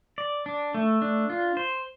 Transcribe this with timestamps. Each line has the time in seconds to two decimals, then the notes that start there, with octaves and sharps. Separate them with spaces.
0.18 D5
0.46 D4
0.74 A3
1.02 D4
1.30 F4
1.57 C5